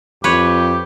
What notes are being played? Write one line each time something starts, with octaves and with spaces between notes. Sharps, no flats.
F2 G4 B4 C#5